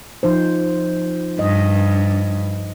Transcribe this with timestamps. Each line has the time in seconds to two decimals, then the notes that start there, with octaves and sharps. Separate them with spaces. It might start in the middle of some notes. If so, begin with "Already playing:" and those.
0.23 F3 D#4 C5
1.39 G2 D#5